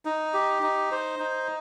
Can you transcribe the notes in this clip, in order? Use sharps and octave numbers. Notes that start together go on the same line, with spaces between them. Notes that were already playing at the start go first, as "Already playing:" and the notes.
D#4
G4
D#4
C5
D#4